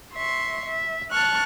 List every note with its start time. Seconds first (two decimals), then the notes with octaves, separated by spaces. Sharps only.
0.14 E5 C6 C#6
0.66 E5
1.11 A5 C#6 F6 F#6